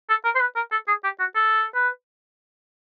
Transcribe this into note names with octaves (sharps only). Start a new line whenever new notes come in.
A4
A#4
C5
B4
A#4
A4
G#4
G4
F#4
A4
B4